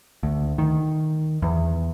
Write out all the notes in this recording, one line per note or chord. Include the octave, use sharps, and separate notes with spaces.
D2
D#3
E2